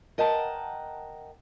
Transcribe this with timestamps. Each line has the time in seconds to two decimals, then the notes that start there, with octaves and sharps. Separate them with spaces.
0.18 A#4 D#5 F#5 G5 A5